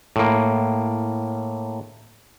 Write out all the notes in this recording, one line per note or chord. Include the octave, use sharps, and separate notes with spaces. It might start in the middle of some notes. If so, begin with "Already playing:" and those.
A2 A#3